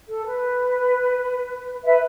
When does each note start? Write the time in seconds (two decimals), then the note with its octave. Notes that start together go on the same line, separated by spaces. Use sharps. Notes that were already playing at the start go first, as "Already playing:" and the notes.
0.08 A4
0.25 B4
1.84 B4 E5